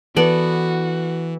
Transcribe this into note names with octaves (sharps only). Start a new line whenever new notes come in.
E3 B3 F#4 A4 D5